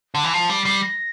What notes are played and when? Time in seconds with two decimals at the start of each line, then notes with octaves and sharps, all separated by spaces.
0.15 D3
0.24 E3
0.33 F3 C7
0.49 G3
0.65 G3
0.82 A#6